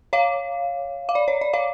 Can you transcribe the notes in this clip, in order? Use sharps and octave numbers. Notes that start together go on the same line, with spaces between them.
C#5 F5
F5
D5
C#5
D5
C#5 F5